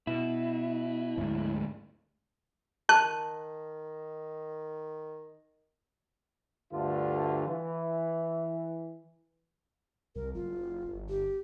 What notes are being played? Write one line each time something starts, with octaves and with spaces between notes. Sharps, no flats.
B2 E4
D2 G#2
D#3 A5 F#6
D2 G2 D3 A3 F4
E3
C2 A#4
F#1 F4
G1
G4